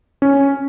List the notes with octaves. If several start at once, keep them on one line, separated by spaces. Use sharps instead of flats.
C#4